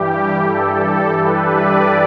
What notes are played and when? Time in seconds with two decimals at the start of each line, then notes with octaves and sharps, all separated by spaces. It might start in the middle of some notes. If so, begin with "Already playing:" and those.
Already playing: G2 E3 G3 G4
0.43 A4
1.20 B4
1.58 D5